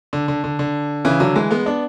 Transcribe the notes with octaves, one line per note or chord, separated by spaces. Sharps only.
D3
D3
D3
D3
C#3 E3
D3 F#3
E3 G#3
G#3 B3
B3 D4